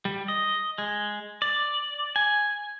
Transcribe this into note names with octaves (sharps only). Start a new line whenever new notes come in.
G3
D#5
G#3
D5
G#5